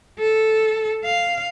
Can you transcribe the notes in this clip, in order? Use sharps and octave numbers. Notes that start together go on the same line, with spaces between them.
A4
F5